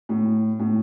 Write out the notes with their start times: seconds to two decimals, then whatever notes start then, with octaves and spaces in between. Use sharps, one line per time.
0.09 A2
0.59 A2